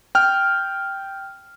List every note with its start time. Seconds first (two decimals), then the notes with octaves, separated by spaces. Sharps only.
0.15 G5 F6